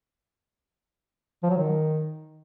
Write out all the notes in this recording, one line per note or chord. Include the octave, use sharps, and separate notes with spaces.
F3
F#3
D#3